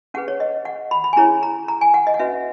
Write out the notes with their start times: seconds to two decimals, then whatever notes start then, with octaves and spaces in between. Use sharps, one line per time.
0.14 C#4 G#4 B4 F#5
0.28 C#5
0.40 D#5
0.65 F#5
0.91 B5
1.04 B5
1.13 G#5
1.16 C#4 E4 G#4 C#5 A#5
1.43 A#5
1.68 A#5
1.81 G#5
1.94 F#5
2.07 D#5
2.14 F#5
2.19 C#4 F#4 B4 E5